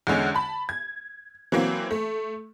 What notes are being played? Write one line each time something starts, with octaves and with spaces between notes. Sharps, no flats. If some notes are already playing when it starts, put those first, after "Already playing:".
E2 D3 G#3 C#4
A5 B5
G#6
E3 F#3 A#3 C4
A3